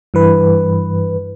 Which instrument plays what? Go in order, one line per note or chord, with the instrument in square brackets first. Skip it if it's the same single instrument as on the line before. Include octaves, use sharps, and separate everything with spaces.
[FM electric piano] G2 E3 B4